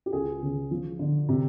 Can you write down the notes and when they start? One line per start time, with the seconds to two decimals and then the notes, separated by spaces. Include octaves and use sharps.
0.06 G4
0.13 C#2 G#4
0.42 C#3
0.71 F3
0.99 D3
1.29 C3